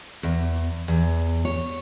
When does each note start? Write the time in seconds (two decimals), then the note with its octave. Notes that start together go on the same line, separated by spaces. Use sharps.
0.23 E2
0.88 E2
1.45 C#5